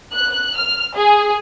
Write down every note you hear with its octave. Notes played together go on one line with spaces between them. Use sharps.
F#6
F6
G#4